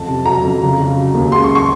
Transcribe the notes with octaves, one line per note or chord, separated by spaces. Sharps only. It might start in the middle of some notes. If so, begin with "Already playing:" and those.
Already playing: F2 A5
C3
F#3 A#5
F2
C#3
C#3
F#3
D#2
C#2 C6
C#6
C#6